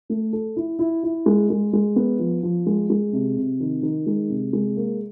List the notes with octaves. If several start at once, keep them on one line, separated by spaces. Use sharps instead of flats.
A3
A4
E4
E4
E4
G#3
G#3
G#3
B3
F3
F3
G#3
G#3
C3
C3
D#3
D#3
G#3
C3
G#3
A#3